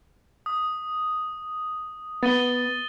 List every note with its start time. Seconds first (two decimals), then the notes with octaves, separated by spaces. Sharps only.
0.46 D#6
2.23 B3 A6 D#7 G7